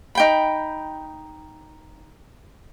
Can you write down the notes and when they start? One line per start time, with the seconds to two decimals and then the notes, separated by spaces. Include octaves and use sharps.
0.15 D#4 G5 B5